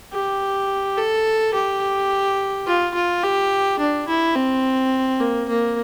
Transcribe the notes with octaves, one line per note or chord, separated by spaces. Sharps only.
G4
A4
G4
F4
F4
G4
D4
E4
C4
A#3
A#3